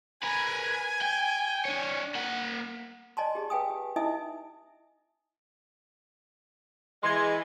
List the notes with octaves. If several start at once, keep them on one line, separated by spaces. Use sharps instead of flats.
A#4 B4 G#5
G5
D4 C#5
A#3 F#5
D5 D#5 G#5 A5 C6
G4 G#4
B4 F5 G5 G#5 D#6
G4
D#4 E4 D#5 E5 G#5 D#6
E3 G#3 C6 G#6